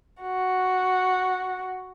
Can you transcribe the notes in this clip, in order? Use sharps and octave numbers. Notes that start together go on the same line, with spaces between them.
F#4